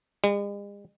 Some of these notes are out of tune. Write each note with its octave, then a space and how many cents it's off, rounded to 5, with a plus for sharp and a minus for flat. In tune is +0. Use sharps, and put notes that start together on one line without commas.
G#3 -45